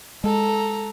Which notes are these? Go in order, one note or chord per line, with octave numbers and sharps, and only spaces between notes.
G#3 A4 A#5